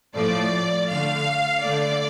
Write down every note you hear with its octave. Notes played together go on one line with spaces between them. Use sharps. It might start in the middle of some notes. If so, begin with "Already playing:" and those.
A2 F3 A3 D5
D3 A3 F5
D3 A3 D5